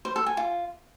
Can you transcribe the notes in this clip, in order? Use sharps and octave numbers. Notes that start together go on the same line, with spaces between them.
C5
A4
G#5
F4